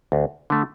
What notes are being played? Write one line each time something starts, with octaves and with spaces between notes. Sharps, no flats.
D2
D3 A3